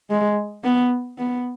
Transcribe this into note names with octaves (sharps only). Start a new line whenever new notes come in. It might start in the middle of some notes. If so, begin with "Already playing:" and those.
G#3
B3
B3